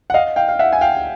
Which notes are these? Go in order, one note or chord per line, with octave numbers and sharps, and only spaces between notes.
F#5
D#5 F5
F5 G5
F5
E5 F#5
G#5
F5 G5